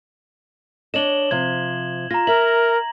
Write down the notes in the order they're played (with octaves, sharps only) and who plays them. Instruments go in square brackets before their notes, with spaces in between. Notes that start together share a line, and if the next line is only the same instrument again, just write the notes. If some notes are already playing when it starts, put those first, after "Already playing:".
[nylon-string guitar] D4 C#5 D#5 [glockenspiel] E7 F#7 G7
[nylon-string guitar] C3 F3 [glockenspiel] G#6
[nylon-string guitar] F4 [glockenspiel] A#5 A#6
[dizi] A#4 [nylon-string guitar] E5 [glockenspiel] F#7